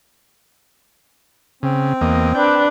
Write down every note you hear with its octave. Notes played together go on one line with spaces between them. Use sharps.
C#3 C4
E2 A#3 D#5
D4 B4 G5